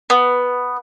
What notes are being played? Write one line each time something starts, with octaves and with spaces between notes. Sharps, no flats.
B3